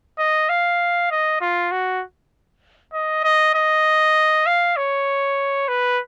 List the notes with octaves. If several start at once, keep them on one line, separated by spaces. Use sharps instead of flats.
D#5
F5
D#5
F4
F#4
D#5
D#5
D#5
F5
C#5
B4